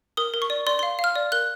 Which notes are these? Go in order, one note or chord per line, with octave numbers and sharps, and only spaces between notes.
A#4 D#6
A#4
C#6
D5
D5 C6
C6
F5
F5
F6
D5
A#4 F#6